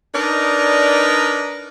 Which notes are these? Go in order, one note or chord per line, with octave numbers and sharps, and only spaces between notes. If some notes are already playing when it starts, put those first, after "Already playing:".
D4 D#4 A#4 B4 D5 D#5